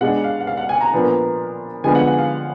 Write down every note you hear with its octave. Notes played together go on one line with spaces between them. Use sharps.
B2 G#3 D4 F#5
F5
F#5
F5
F#5
G#5
A#5
A#2 F3 B3 D4
D3 F3 G#3 B3 D4 G#5
F#5
F#5
F5